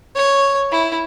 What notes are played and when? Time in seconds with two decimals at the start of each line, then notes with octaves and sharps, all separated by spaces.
0.15 C#5
0.72 E4